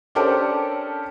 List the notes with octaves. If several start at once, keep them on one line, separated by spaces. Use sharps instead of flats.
C#4 D4 G4 A4 A#4 C5